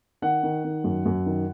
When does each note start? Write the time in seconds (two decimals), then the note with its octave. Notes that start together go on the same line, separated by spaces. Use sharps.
0.22 D#3 F#5
0.43 D#3
0.64 D#3
0.84 F#2
1.06 F#2
1.26 D#3